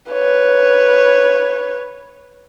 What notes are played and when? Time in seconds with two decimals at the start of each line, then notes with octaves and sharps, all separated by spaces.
0.11 B4 C#5